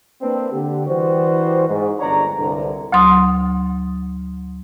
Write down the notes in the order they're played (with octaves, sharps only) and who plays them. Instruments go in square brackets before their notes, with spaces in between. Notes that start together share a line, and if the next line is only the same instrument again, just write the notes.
[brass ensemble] A#3 C4 D4 B4
D3 G4
E3 G3 F#4 G4 C5
G#2
G1 C#2 D4 C#5 D5 A#5
C2 G2 D3
[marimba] D2 F#3 C6 D#6